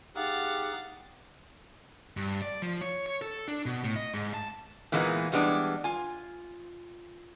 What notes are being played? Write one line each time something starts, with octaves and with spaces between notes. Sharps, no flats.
D#4 G4 G#4 F5 F#5 A6
G2
D5
F3
C#5
C#5
A4
D4
B2
A2
D#5
G#2
A5
A#2 E3 G#3 A#3 B3 D#4
E3 G3 G#3 B3 D4
F4 G#5